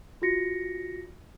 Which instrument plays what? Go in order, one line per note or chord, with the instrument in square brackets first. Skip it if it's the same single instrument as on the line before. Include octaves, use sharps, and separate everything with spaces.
[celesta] F4 F#4 A#6 C#7